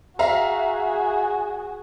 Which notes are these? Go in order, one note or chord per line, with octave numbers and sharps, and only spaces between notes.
F#4 G#4 E5 F5 A#5